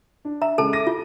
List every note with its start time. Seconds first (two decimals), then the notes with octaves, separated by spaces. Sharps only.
0.25 D4
0.42 E5 A#5
0.58 C#3 G#3 A4 A5
0.73 D6 A#6 D#7
0.87 F4